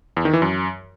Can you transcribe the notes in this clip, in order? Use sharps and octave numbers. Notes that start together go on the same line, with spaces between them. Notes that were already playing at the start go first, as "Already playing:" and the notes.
E2
D#3
E3
F#2